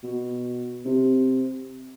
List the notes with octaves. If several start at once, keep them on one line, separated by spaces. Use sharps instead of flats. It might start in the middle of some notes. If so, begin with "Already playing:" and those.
B2
C3